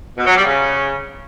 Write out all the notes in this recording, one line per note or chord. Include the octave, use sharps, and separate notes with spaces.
B2
F#3
G3
C#3